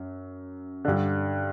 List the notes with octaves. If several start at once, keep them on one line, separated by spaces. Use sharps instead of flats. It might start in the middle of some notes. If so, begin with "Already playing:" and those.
Already playing: F#2
G2 D3